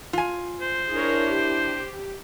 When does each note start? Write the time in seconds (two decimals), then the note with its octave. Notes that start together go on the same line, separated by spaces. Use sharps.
0.13 F4 G#5
0.61 C5
0.91 D4 E4 G#4 A#4 C#5
1.26 G4